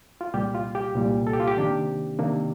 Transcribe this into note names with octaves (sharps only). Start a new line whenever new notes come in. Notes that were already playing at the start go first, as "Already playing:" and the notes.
F4
C2 A#2 G3 G4
F4
G4
C2 A#2 G3
A4
G4
F4
G4
C3 D#3 A#3 D4
C3 D#3 A#3 D4